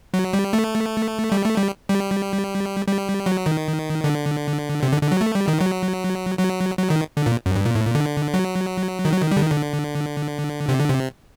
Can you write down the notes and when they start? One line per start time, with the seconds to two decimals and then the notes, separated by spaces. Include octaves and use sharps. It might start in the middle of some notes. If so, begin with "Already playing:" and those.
0.14 F#3
0.33 G3
0.53 A3
1.32 G3
1.44 A3
1.57 G3
1.89 G3
2.87 G3
3.26 F#3
3.46 D#3
4.04 D3
4.83 C3
4.92 D3
5.02 D3
5.11 F#3
5.21 A3
5.35 G3
5.48 D#3
5.61 F#3
6.39 F#3
6.78 F#3
6.90 D#3
7.17 D3
7.26 A#2
7.46 F#2
7.55 G2
7.65 A#2
7.75 A2
7.86 A#2
7.95 D3
8.34 F#3
9.05 D#3
9.12 F#3
9.22 D#3
9.31 G3
9.36 D3
9.41 D#3
9.51 D3
10.68 C3
10.79 D3
10.89 C3